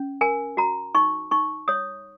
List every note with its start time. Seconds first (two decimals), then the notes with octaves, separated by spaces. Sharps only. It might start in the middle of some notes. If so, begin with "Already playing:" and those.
Already playing: C#4
0.21 A#4 G#5
0.57 F#4 A#5
0.95 D#4 C#6
1.31 D#4 C#6
1.68 C#5 D#6